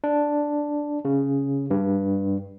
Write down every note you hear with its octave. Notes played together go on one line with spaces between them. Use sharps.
D4
C#3
G2